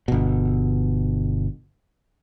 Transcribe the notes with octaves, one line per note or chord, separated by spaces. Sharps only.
G1 B2